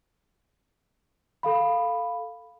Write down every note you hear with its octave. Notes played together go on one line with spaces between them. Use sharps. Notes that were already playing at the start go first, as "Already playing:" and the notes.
A4 F5 B5